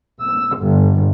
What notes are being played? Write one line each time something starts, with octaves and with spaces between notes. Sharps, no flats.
E6
G1